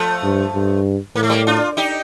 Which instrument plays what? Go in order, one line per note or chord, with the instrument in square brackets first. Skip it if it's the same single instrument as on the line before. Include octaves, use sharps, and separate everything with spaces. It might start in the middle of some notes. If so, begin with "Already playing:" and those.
Already playing: [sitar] F3 A3
[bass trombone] G2
G2
[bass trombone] A2 [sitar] A#3
[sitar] A3
G3 A#3
D4 F4
D#4 G4